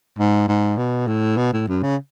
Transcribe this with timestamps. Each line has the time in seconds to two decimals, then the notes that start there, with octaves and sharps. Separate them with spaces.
0.19 G#2
0.48 G#2
0.77 B2
1.08 A2
1.37 B2
1.53 A2
1.68 F#2
1.83 C#3